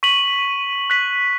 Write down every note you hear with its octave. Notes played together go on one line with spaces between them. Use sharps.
C#6 B6 D#7 F#7
F#6 B6 F#7